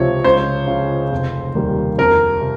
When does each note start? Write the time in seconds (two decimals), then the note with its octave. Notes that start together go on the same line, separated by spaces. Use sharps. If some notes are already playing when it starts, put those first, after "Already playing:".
Already playing: C#2 C3 F3 C4 C#5
0.24 C#2 C5
0.68 C#3 F3
1.12 F1
1.55 D#2 D#3 G3
1.98 F2 A#4
2.41 C3